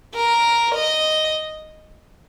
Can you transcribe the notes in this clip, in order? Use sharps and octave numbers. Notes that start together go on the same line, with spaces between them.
A#4
D#5